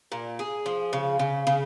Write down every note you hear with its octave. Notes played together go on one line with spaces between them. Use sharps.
A#2
G#4
F3
C#3
C#3
C#3